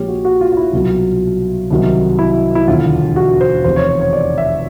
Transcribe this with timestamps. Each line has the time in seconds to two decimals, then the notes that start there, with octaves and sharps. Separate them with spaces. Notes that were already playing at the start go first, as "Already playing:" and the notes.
Already playing: A#1 A#2 F3 G#3 G4 C#5
0.08 F#4
0.25 F#4
0.41 F4
0.52 F4
0.57 E4
0.73 C2 B2 F#3 F4
1.71 C2 C3 D#3 F#3
2.19 E4
2.55 E4
2.67 E1 D#2 D3 F4
3.16 F#4
3.41 C5
3.64 F1 E2 C3 C5
3.76 C#5
3.89 C5
4.01 C#5
4.13 D5
4.38 E5